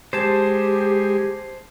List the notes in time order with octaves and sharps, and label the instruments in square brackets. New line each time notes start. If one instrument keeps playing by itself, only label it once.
[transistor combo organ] G#3 [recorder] G4 [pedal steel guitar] C5 A5